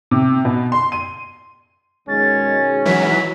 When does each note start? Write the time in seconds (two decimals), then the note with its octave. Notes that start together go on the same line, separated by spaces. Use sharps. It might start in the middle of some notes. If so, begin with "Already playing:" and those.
0.11 C3
0.45 B2
0.72 C6
0.92 D#7
2.08 B1 D#3 G#3 C#4 A6
2.85 E3 F#3 B6